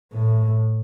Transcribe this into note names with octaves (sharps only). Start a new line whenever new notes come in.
A2